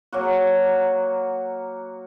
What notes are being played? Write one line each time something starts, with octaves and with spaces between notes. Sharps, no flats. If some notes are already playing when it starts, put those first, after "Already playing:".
F#3 A#3 F#4